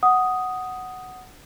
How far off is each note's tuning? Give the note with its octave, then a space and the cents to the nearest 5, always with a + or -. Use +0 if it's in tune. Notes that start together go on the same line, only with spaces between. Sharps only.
F#5 +5 D#6 +0